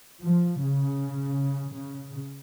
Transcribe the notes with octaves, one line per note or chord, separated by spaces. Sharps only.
F3
C#3
C#3